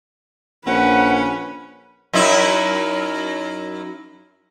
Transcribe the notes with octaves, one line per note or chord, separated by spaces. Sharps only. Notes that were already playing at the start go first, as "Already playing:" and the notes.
A#1 C#4 B4 F#5
F#2 D#4 E4